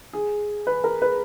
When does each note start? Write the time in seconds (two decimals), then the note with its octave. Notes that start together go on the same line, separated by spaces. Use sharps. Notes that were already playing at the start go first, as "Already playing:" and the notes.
0.13 G#4
0.67 B4
0.84 A#4
1.02 B4